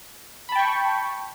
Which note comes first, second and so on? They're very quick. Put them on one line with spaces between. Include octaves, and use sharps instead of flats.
B5 A5 G5 C#6